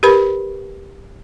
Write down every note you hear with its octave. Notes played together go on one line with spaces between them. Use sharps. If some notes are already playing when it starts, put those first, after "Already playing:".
G4 A#4 B4 B5